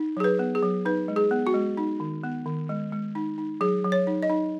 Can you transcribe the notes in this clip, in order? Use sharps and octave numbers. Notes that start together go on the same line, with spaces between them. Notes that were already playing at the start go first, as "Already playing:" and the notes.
Already playing: D#4
F#3 G#4
B4
B3
G#4
F#3
D#4 B4
G#3
G#4
B3
F#4
G#3
D#4
D#3
B3
D#3
G#3
G#3
D#4
D#4
F#3 G#4
F#3
C#5
D#4
D#5
D#4